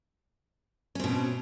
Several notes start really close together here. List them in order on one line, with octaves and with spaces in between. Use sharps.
C#4 C4 B2